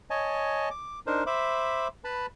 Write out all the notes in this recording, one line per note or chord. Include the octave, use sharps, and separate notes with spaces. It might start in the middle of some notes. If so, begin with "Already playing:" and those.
C#5 D#5 G#5 A5
D6
D4 D#4 A#4 C5
C5 E5 B5 D6
B4 A5 B5